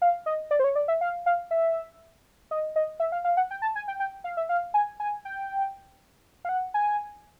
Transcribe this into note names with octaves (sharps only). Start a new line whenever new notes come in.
F5
D#5
D5
C5
C#5
D5
E5
F5
F5
E5
D#5
D#5
E5
F5
F5
F#5
G5
A5
G#5
G5
G5
F5
E5
F5
G#5
G#5
G5
F5
F#5
G#5